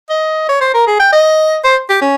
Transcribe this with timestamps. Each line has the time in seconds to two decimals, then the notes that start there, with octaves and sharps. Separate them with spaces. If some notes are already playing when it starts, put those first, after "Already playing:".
0.10 D#5
0.49 C#5
0.61 C5
0.74 A#4
0.87 G#4
1.00 G5
1.12 D#5
1.64 C5
1.90 G4
2.02 C#4